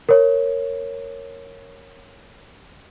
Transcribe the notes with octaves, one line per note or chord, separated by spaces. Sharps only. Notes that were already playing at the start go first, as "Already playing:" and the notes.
A#4 C#5